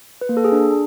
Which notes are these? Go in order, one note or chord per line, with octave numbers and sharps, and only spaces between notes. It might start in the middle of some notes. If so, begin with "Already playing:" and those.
B4
A#3
A4
G#4
D4